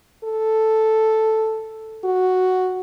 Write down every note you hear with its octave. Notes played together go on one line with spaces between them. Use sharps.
A4
F#4